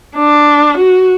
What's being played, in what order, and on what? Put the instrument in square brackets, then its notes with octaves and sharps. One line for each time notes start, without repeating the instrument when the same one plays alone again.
[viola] D4
F#4